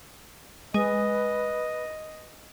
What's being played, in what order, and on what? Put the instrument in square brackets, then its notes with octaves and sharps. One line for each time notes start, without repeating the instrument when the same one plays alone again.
[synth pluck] G#3 [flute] B4 [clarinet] D#5